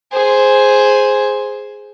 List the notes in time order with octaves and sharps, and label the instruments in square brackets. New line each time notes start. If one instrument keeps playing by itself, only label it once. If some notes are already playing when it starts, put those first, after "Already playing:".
[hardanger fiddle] G#4 C5